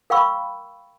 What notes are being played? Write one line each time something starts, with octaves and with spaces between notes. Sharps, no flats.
A#4 F5 G5 B5 C#6 E6